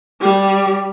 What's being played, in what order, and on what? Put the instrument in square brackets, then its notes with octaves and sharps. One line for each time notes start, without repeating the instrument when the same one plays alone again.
[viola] G3